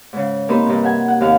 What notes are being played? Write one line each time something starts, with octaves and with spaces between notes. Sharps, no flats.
G#2 C#3
A#3 C4 D#4 G4 B4 C5
G2 C3
G4 E5 F#5 G#5
F#5
D#2 C4 G4 F5 F#5